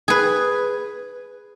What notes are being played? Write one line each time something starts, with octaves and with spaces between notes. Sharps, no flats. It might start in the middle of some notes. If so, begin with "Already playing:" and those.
G#4 B4